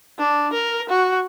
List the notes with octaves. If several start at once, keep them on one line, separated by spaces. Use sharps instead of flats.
D4
A#4
F#4